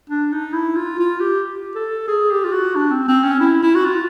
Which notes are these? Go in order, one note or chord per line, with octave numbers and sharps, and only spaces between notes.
D4
D#4
E4
F4
F4
G4
A4
G#4
G4
F4
F#4
D4
C4
C4
C#4
E4
E4
F#4
F4